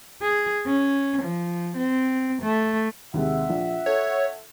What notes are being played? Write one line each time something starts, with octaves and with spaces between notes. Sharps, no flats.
G#4
C#4
F3
C4
A3
D#2 C3 G#3 E5 F#5
A#1
A4 C#5